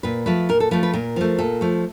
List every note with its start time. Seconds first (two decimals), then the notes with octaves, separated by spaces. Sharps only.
0.03 A#2 B4
0.26 F3 A3 B4
0.49 A#2 A#4
0.60 A4
0.71 F3 A3 B4
0.83 B4
0.93 A#2 A#4
1.16 F3 A3
1.38 A#2 A4
1.61 F3 A3